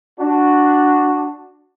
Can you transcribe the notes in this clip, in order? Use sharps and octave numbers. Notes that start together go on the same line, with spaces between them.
D4 F#4